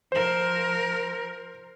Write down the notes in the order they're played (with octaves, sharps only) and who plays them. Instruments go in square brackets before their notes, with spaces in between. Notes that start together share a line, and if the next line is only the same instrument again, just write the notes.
[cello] F3 A#4 [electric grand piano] C5 E7